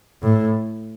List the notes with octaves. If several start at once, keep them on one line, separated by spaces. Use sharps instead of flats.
A2